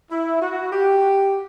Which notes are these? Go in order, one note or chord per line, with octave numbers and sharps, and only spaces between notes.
E4
F#4
G4